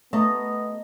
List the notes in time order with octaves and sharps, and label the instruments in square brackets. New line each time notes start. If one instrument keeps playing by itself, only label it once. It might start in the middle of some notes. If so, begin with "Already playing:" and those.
[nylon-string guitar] A3 [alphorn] B3 [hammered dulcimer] D#5 A#5